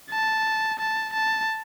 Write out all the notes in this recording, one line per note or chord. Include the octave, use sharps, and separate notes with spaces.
A5
A5
A5